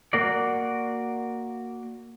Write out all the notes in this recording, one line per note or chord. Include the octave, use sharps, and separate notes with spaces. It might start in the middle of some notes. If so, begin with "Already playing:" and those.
A#3 F#4 D5